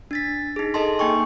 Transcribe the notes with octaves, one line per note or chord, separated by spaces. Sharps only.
D4 A6 B6
D#4 G#4
G#4 A4 D#5 A5 C6
A#3 D#4 G5 G#5 C#6